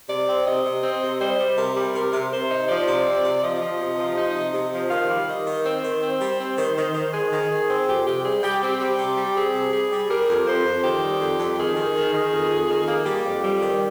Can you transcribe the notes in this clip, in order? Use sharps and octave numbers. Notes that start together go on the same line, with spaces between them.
C3 D5
C4
C3 D#5
C3
C4
C3
G3 C5
G3
C3 A#4
G3
C3 A#4
C3
C3 C5
D#4
F3 D5
C3
C4
C3
F3 D#5
F3
C3
F3
D#4
C3
C3
F3
D#3 F5
G3
D#3 D#5
D#3
C4 C5
D#3
C4
G3
C4
D#3
D#3
D#3
D#3 G#4
D#3
D#3
C4
F2 G4
C3 G4
G3 G#4
G3 G4
C4 G4
G3
C3
G3
C4 G#4
C3
G3 G#4
G3
G3 A#4
F2
F2 C5
F2
D#3 G4
G3
F2
F2
D#3 G#4
D#3
D#3
D#3
F2
F2
D#3
A#3
G3 G4
F2
G3
D#3